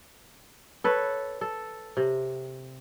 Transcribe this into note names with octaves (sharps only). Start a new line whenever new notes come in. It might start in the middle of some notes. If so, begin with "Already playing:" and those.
A4 B4 C#5
A4
C3